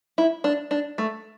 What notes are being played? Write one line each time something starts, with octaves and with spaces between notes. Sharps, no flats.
E4
D4
D4
A3